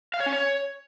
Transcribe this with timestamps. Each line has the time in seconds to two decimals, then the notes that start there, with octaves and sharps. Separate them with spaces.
0.14 F5
0.20 C#5
0.26 C#4
0.33 C#5